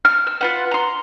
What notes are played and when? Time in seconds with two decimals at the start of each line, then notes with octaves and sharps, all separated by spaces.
0.05 F6
0.27 E6
0.41 F4 B4 F#5
0.71 A#5 C6